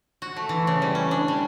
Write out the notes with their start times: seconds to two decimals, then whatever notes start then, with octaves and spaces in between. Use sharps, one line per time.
0.22 F#4
0.36 A3
0.49 E3
0.67 C#3
0.82 G3
0.95 C#4
1.11 D4
1.28 G3